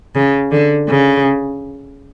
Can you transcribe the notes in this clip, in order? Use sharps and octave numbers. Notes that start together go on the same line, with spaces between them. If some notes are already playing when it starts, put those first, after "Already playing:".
C#3
D3
C#3